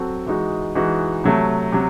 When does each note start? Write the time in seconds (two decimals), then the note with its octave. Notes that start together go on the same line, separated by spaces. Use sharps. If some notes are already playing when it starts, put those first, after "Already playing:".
Already playing: F#3 C4 F#4 A4
0.26 E3 G#3 D#4 F#4
0.75 E3 G#3 D#4 F#4
1.24 C3 F#3 A3
1.72 C3 F#3